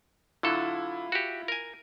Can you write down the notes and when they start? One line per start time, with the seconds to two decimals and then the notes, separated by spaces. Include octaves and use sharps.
0.43 D3 F#3 E4 F4 A4
1.12 F#4 G4
1.48 A#4 G#5